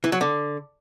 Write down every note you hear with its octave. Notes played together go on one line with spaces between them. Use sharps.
E3
F#3
D3